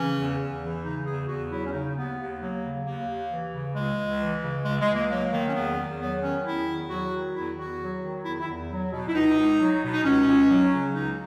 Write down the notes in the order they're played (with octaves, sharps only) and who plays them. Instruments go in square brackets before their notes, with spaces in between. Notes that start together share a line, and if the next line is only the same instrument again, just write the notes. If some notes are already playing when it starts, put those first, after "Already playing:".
Already playing: [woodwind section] C#3 E3 C#4
E2
E2
E3
C#3 D#4
E2 G#4
E2 F#4
F#3 E4
C#4
C#3 D#4
D#2 B3
D#2
F#3 A#3
C#3
D#2 A#3
D#2
E3
C#3
C#2 G#3
C#2
E3
C#3
C#2 G#3
G#3
C#2
A#3
F#3 A#3
D#3 A#3
C#4
E2 B3
E2
F#3 B3
D#3 C#4
E2 E4
E2
F#3 F#4
D#3
E2 E4
E2 F#4
F#3
D#3
E2 E4
E4
E2
F#3
B2
E4
C#2 D#4
C#2
F#3
B2
D#4
C#2 C#4
C#2
F#3
C#3
C#2 D#4